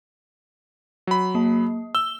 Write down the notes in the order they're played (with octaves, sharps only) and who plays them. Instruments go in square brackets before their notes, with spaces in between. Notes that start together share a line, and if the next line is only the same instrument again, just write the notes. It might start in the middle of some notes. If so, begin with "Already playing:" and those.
[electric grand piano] F#3 B5
[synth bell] A#3
[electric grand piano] E6 [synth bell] G7